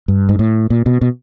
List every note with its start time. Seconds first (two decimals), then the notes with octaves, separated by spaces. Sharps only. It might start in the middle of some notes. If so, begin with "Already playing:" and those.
0.08 G2
0.29 G#2
0.39 A2
0.70 A#2
0.86 B2
1.01 B2